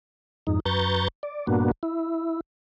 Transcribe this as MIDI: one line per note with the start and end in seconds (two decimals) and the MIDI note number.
0.47 0.60 41
0.47 0.60 44
0.47 0.60 63
0.66 1.08 42
0.66 1.08 71
0.66 1.08 82
0.66 1.08 85
0.66 1.08 91
0.66 1.08 93
1.23 1.46 74
1.47 1.71 43
1.47 1.71 46
1.47 1.71 58
1.47 1.71 59
1.47 1.71 62
1.47 1.71 66
1.83 2.41 64